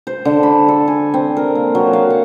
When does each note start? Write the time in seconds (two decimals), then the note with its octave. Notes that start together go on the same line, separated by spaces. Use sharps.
0.07 C5
0.25 D3
0.43 B5
0.68 A4
0.88 G#5
1.14 C4
1.37 A#4
1.55 A#3
1.75 F#3
1.93 F5
2.10 F#5